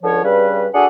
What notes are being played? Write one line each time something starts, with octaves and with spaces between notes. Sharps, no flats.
C#2 D3 F3 C#5
G2 C#3 G3 B4
D4 F#4 G#4 A4 F#5 G#5